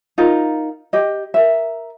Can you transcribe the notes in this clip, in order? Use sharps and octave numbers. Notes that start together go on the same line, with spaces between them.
D#4 F4 A#4
G4 D#5
A#4 E5